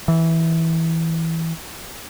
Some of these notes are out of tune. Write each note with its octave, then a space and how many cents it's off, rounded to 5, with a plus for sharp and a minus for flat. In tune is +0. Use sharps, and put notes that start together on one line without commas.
E3 -10